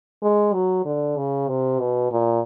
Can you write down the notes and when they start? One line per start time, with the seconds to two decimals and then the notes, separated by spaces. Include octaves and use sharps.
0.23 G#3
0.53 F#3
0.85 D3
1.17 C#3
1.49 C3
1.80 B2
2.12 A#2